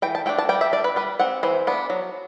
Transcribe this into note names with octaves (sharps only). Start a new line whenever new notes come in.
E3 G5
A5
A3 D4 G5
A5
G3 G5
E5
D4 D5
B4
G3 B4
C4 F#5
E3 C5
B3 D4
F#3